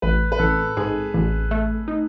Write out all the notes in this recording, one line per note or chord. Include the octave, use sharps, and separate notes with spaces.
A1 B4
B4
A1 A4
G#2 G#4
A1
A3
D#4